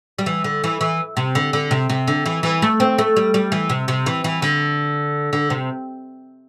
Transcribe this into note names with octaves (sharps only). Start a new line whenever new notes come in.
G3
E3
D3
E3
E3
C3
D3
D3
C3
C3
D3
E3
E3
A3
C4
A3
G3
G3
E3
C3
C3
E3
E3
D3
D3
C3